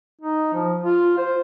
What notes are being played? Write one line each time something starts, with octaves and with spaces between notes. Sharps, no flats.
D#4
F3
F4
C5